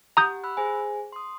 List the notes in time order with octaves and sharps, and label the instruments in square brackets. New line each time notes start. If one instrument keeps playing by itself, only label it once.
[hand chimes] G4 F#5 [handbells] A#5 D#6 G6
[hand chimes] B5 E6 F#6
G#4 C5 G#5
C6 D#6